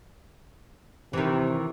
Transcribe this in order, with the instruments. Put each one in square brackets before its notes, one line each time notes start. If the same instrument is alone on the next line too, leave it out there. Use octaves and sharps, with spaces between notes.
[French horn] C3 [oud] D#3 E3